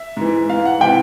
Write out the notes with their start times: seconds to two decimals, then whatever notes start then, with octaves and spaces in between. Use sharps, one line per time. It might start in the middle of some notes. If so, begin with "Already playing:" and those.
Already playing: E5
0.17 G#2 E3
0.49 G#2 E3 F5
0.65 F#5
0.81 C3 E3 G5